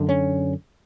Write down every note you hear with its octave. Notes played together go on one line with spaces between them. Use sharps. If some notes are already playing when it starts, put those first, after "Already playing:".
Already playing: F#2 D3
C#4